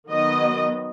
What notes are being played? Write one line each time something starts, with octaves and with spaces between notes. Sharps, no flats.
D#3 F#3 B3 D#5